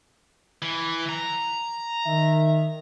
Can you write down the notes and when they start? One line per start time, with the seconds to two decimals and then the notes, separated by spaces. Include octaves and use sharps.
0.62 E3
1.09 A#5
2.05 D#3 E5